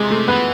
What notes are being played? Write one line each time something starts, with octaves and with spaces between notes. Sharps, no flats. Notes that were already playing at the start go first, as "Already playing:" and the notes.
Already playing: C3 G#3
A3
E3 B3